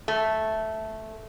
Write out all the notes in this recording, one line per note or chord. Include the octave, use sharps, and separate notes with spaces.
A3